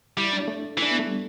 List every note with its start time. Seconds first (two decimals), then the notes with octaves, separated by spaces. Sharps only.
0.17 G3 E4
0.33 D4
0.48 A3
0.78 E3 D4
0.91 B3
0.99 A3
1.06 G3